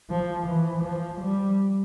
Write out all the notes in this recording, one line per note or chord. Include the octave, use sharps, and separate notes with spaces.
F3
E3
F3
G3